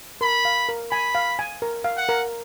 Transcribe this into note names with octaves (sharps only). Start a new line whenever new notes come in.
A#4 B5
F5
A#4
G#5 B5
F5
G#5
A#4
F5
F#5
A#4